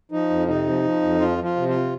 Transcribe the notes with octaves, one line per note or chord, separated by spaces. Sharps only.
F3 D#4
F2
C3 D#4
F3
F3
F2
F3 F4
F3
F4
C3
F4